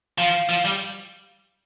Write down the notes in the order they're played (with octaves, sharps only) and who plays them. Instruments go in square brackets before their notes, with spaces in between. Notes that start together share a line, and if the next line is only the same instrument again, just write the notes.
[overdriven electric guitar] F3 [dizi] F5
[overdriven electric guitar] F3
G3